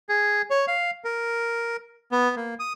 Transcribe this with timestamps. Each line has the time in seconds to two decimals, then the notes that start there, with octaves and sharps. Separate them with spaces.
0.09 G#4
0.50 C#5
0.68 F5
1.04 A#4
2.12 B3
2.36 A#3
2.59 D#6